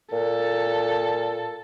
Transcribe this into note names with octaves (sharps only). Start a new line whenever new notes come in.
A#2 A4